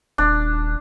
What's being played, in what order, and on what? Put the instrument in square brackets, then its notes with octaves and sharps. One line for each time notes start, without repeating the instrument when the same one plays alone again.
[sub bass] D#1 [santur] D4